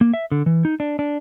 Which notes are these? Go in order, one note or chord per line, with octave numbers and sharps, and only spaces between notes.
A#3
E5
D3
E3
D#4
D4
D4